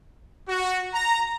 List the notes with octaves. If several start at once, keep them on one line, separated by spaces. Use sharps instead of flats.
F#4
A#5